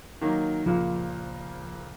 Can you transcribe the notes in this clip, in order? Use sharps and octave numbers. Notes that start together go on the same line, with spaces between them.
D#3 F#3 A#3
C#2 A#2 F3 A#3